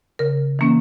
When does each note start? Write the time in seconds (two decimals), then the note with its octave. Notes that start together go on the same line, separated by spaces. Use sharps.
0.19 C#3 A#4
0.59 E3 A#3 C#4